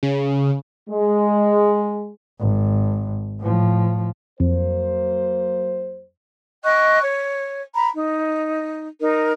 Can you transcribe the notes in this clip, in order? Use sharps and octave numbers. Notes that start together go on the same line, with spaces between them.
C#3
G#3
G#1
A2 F3
F2 F#3 A#3 C5
D#5 G5 C#6 F#6
C#5
A#5 B5
D#4
D#4 A#4